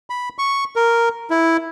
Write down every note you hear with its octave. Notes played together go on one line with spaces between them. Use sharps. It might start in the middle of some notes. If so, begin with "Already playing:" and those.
B5
C#6
A#4
E4